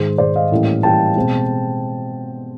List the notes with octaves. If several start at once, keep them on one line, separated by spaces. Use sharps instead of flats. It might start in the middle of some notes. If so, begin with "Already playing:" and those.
Already playing: G#2 D#3 G#3 C5
G#2 D#3 G#3 C5 D5
D#5 F5
A2 E3 G3 A#3 C#4
A2 E3 G3 A#3 C#4 G5 A5
B2 G#3 C4